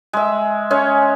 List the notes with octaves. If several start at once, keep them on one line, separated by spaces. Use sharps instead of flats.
G#3 E5
G#3 C#4 C#5